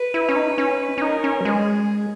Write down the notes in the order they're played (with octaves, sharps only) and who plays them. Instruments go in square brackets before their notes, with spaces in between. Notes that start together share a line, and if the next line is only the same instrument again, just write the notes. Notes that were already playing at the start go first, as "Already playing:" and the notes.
Already playing: [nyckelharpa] B4
[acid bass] E4
C#4
D#4
C#4
C#4
[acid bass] D#4 [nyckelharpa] A#4
[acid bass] C#4
F#3
[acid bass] G#3 [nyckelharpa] G#4